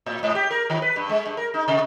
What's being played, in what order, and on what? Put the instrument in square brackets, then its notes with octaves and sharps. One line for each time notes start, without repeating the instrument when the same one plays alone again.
[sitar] A2
G#2
G4
A#4
D#3
B4
G2
G#3
G2
A#4
D#4
C3